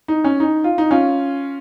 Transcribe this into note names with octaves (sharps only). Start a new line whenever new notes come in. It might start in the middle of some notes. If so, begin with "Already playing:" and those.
D#4
C#4
D#4
F4
D#4
C#4 F4